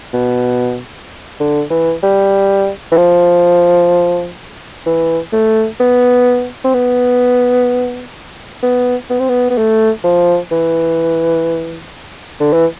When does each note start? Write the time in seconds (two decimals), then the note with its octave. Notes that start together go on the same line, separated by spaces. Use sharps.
0.14 B2
1.40 D3
1.71 E3
2.03 G3
2.92 E3
2.97 F3
4.86 E3
5.33 A3
5.80 B3
6.65 C4
6.74 B3
8.63 B3
9.10 B3
9.20 C4
9.29 B3
9.51 B3
9.58 A3
10.04 F3
10.52 E3
12.40 D3
12.53 E3